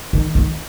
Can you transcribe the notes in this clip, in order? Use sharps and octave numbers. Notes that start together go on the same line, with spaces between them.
D#3
D#3